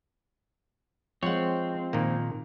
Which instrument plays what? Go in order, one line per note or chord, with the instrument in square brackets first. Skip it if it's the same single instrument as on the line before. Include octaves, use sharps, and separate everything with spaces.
[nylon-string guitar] F3 G#3 [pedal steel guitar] C4 [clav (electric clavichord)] C#5 F#5
[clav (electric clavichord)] A#2 D#3 A#3